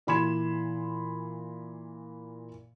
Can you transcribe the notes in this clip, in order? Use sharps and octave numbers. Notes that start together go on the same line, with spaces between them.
A#2 E3 B5 C6 G#6 E7